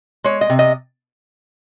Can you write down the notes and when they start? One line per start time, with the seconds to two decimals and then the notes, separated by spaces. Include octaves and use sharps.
0.24 G#3 C#5
0.41 D#5
0.50 C3
0.59 D#5